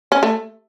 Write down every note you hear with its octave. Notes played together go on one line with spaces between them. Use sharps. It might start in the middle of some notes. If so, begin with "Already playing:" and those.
C#4
A3